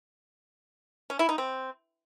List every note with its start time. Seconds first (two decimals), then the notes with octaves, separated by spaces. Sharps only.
1.10 C#4
1.19 E4
1.29 D#4
1.38 C4